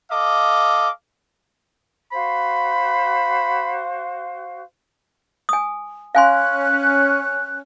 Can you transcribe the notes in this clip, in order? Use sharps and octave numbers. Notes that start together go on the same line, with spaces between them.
A4 D#5 F5 D6
F#4 C5 F5 B5
G#5 D#6
C#4 F5 G#5 C6 F#6